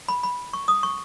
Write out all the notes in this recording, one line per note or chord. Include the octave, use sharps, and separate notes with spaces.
B5
B5
C#6
D#6
C#6